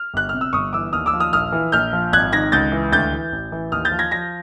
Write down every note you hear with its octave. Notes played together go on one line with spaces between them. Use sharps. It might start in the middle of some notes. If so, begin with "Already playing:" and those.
Already playing: F6
G1 F#6
C3 F6
E6
G1 C#6 D#6
E3 D6 E6
D#2 D#6 F6
D6 E6
F3
D#6 F6
A#1 D#6 F6
E3
A#1 F6 G6
F3
G#1 F#6 G#6
D#3 G#6 A#6
C#2 G6 A6
E3
D2 G6 A6
E3
A1
E3
D#2 D#6 F6
G6 A6
F3
G#6 A#6
F3 G#6 A#6